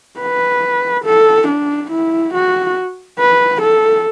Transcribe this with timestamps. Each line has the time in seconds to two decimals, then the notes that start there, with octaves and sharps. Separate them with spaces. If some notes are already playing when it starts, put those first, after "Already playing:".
0.20 B4
1.05 A4
1.48 D4
1.91 E4
2.34 F#4
3.19 B4
3.62 A4